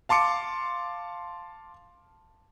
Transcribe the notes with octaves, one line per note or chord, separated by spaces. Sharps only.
F5 A5 C6 D6 C#7